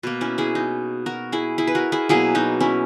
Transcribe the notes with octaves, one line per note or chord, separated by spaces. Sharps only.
B2 A#3
C#4 E4
E4 G#4
D#4
F#4 A#4
E4 G#4
E4 G#4
B4
F#4 A#4
E4 G#4
B2 F#3 A#3 E4 G#4
D#4 F#4
C#4 E4